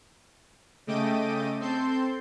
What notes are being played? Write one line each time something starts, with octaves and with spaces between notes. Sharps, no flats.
C#3 A3 D#5 G5 D6 D#7
C4 A4 C6 G6